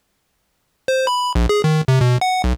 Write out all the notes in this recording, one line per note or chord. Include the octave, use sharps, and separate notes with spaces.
C5
B5
A#1
G#4
D#3
C3
B2
F#5
B1